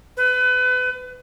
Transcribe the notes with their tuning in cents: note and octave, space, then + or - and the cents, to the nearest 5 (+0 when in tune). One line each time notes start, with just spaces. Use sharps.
B4 +30